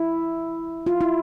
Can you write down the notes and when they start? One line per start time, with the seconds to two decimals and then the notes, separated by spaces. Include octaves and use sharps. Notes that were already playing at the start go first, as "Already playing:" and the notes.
Already playing: E4
0.86 F4
1.01 E4